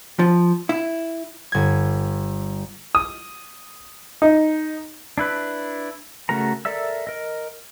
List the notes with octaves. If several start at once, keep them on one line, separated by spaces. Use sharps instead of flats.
F3
E4
G1 G#6
D#6
D#4
D4 E4 B4
C#3 A3 F#4 A#4 A#5
A4 A#4 D5 E5 E6
A#4 D#5